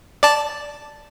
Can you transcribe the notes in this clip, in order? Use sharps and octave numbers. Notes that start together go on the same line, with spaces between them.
D5 A5